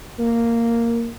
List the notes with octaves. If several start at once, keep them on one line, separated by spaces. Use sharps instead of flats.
A#3